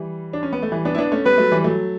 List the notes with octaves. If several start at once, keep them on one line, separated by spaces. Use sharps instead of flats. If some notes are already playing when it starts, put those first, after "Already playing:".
Already playing: E3 G3
D4
C#4
B3
A3
E3 G3
B3 D4
E4
B3 D4
A3 C#4
G3 B3 B4
F#3 A3
E3 G3
F#3 A3